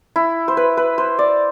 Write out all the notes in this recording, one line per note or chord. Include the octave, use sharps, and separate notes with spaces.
E4
C5
B4
B4
C5
D5